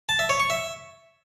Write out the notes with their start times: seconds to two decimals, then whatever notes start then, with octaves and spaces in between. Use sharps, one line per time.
0.09 A5
0.19 E5
0.29 C#5
0.40 C#6
0.50 E5